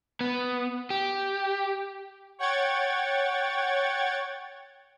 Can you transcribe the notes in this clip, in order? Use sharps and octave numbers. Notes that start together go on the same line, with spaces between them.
B3
G4
C#5 F#5 G5 C#6 G#6 A6